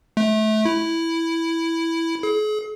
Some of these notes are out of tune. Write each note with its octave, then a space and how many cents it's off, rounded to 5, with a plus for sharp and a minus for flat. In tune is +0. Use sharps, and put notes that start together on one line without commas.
A3 -25
E4 +0
G#4 +40